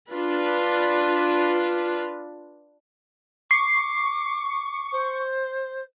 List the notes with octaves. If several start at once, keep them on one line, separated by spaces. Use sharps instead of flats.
D4 F4 B4
C#6 D6 C7
C5